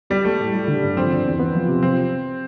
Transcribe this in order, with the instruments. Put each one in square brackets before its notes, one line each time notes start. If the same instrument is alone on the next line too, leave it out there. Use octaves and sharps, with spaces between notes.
[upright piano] G3 [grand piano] B3
[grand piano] G3 [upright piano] A3
[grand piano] A2
G3
D3
G2
[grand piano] F3 [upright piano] C4
[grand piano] D3
E2
B3
F3
C3
[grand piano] F3 [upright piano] C4